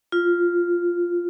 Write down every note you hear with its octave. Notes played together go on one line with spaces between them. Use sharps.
F4